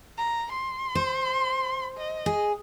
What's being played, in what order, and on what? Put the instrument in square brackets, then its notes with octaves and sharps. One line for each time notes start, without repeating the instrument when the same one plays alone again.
[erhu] A#5
C6
[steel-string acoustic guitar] C5
[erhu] D#5
[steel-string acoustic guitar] G#4